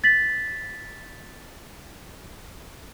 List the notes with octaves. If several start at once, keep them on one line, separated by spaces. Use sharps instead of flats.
A6 B6 F#7